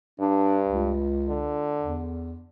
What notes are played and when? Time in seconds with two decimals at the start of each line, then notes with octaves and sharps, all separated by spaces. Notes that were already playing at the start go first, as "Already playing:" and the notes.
0.20 G2 D4
0.67 C#2
1.29 D3
1.80 E2